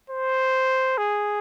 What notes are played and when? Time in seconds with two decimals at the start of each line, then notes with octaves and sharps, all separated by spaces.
0.10 C5
0.98 G#4